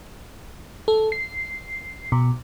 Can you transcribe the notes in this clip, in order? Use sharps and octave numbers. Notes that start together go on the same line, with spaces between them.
A4
C7
B2